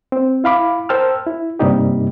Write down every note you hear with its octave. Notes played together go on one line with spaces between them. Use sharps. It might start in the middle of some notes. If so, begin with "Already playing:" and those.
C4
E4 F5 B5 D6
A#4 C5 G5 A5 E6 F6
E4
G2 C3 G3 A#3 D#4 G4